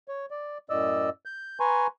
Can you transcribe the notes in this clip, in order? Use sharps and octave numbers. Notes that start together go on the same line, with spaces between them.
C#5
D5
F#2 A2 D5 D#5 E6
G6
B4 G#5 A#5 C6 C#6